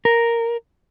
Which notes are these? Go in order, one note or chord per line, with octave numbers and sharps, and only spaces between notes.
A#4